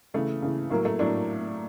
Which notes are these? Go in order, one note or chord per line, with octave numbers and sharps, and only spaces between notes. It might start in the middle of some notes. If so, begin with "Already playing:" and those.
C#3 E3 A3
C#3 E3
A2 F#3 A#3
A3
A2 F#3 D4